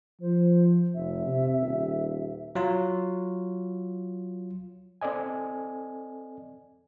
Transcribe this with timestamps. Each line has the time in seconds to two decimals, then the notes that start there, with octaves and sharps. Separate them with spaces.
0.21 F3 C5
0.95 F1 E5
1.26 C3
1.60 D#1
2.55 F#3 F4
5.01 C4 A4 D5 D#5 G#5